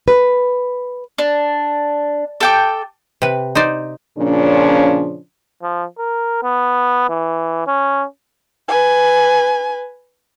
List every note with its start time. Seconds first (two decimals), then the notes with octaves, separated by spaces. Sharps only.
0.08 B4
1.18 D4
2.40 A4 G5 D6
3.22 C3 B4
3.55 D#4 C5 D5
4.18 A#2 C#3 F3 C#4 D4
5.62 F3
5.99 A#4
6.43 B3
7.09 E3
7.67 C#4
8.69 B4 G#5